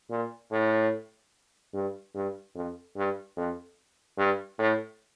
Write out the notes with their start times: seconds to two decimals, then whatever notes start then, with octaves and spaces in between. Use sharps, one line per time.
0.10 A#2
0.51 A2
1.74 G2
2.15 G2
2.55 F2
2.96 G2
3.36 F2
4.18 G2
4.59 A2